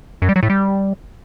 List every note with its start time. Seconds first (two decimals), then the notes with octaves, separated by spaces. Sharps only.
0.22 F#2
0.29 G3
0.36 F#3
0.43 A2
0.50 G3